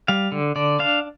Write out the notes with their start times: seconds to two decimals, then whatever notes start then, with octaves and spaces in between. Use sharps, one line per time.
0.08 G3 F5
0.32 D3
0.56 D3 D5
0.79 D4 F5